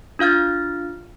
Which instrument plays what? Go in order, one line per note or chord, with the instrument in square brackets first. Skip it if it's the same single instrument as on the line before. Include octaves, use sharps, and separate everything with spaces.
[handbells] D4 F4 F5 F6 A6